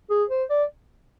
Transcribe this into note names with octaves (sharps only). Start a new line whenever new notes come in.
G#4
C5
D5